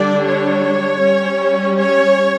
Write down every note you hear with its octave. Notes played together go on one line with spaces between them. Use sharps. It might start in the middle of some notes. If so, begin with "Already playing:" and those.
Already playing: D3 G3 D4 D5
C#5
G3 C#4
C#5